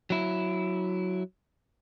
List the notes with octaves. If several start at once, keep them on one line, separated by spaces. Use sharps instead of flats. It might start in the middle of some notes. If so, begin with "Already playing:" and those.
F#3 E4